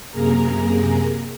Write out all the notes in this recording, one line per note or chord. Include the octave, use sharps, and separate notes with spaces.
F#2 C3 A#3 G#4 A#4 A#5